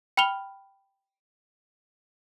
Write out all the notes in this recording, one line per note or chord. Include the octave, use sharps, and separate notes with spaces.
G5 B5 F6 F7 G7